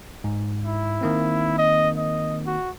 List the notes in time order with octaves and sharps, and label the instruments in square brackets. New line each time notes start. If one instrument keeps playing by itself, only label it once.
[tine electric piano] G#2
[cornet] E4
[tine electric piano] D#3 A#3 C4
[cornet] D#5
D#5
F#4